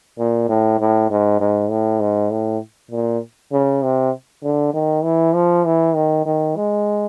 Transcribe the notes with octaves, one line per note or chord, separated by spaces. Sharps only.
A#2
A2
A2
G#2
G#2
A2
G#2
A2
A#2
C#3
C3
D3
D#3
E3
F3
E3
D#3
D#3
G#3